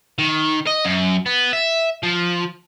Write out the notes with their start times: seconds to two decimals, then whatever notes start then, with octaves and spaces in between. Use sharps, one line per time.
0.19 D#3
0.67 D#5
0.85 F#2
1.26 B3
1.53 E5
2.03 F3